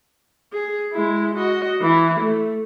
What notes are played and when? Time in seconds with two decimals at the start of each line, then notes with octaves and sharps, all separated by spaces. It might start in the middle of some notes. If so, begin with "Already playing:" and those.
0.53 G#4
0.92 G#3 E4
1.35 F#4 D#5
1.81 E3 E4
2.20 A3